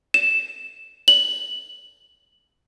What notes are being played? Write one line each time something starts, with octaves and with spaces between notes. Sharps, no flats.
E7
F#7